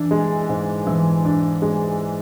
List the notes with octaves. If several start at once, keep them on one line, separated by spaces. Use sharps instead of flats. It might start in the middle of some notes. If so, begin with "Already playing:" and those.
Already playing: E3 D4
G#3
G#2
E3
D4
G#3